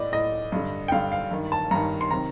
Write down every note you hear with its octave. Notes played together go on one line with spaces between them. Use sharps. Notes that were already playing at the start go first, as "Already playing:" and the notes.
Already playing: A2 D5 D#5
A2 D#5
G2 D3
G5
G2 D3 F5
F5
G2 D#3
A5
G2 D#3 A#5
C6
C3 D#3 A#5